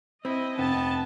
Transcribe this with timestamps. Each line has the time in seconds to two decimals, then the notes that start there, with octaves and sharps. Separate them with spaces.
0.25 C4 E4 D#5
0.58 F1 B3 G5 A5